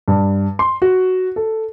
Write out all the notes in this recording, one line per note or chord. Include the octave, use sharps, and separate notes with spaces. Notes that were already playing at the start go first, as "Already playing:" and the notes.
G2
C6
F#4
A4